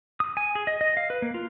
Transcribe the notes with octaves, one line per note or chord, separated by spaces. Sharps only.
D#6
G#5
G#4
D#5
D#5
F5
B4
A#3
F4